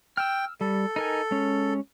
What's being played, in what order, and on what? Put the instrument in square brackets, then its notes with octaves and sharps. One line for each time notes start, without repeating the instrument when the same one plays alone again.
[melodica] G5 [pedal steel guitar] E6 F6
[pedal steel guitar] G3 [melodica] A4
[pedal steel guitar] D#4 A#4 G#5
G#3 C#4